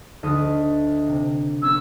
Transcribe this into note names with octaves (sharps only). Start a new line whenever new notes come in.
D2 D#5 D#6
C3
B3 C#4 E6